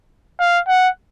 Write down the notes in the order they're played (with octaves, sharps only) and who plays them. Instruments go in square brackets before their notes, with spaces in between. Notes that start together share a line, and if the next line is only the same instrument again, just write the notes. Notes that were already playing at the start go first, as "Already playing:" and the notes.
[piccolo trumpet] F5
F#5